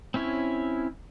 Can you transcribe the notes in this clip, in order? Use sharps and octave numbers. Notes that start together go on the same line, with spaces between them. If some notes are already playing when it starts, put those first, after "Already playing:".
C4 C#4 E4 C#5